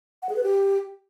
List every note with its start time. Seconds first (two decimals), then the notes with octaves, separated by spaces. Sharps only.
0.22 F#5
0.29 G#4
0.36 B4
0.43 G4